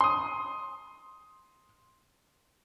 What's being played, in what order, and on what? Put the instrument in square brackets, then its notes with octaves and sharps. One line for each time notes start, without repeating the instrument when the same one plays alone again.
[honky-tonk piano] C6 D#6